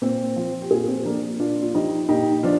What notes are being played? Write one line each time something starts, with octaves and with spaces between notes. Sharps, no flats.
A#2 C4
F3
G4
A#2 F4 G#4
C4
F3 A#3 D4
A#2 D4 F4
F4
F3 D#4 G4
A#2 D#4 G4
F3 D4 F4